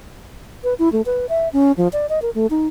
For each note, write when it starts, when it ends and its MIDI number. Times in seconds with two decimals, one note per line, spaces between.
0.64 0.74 71
0.79 0.92 64
0.92 1.02 57
1.06 1.26 71
1.29 1.48 76
1.53 1.72 61
1.77 1.88 53
1.93 2.07 74
2.09 2.19 75
2.22 2.30 70
2.35 2.47 57
2.50 2.67 63